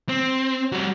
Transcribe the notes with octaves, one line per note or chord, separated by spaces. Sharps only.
C4
G3 F#4